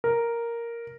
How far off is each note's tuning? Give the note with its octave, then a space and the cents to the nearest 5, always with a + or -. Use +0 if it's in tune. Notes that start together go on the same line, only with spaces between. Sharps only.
A#4 +0